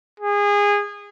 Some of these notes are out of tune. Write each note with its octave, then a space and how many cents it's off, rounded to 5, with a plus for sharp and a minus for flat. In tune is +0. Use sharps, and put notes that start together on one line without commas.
G#4 -25